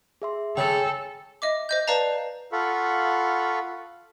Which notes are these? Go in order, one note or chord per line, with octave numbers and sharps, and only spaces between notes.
G#4 E5 C6
C#3 A4 G5 G#5
D#5 E5 D6
C5 D#5 G6
B4 D5 F5 A5 A#5
F4 A4 F5 F#5 B5 C#6